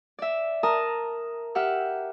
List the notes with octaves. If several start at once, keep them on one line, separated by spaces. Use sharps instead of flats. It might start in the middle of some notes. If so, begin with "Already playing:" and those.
D5 E5
A#4 A5 A#5 D#6
G4 E5 F#5 F6